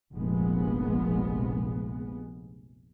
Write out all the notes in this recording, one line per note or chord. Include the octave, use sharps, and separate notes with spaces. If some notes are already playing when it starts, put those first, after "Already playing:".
F1 A#1 G#3 B3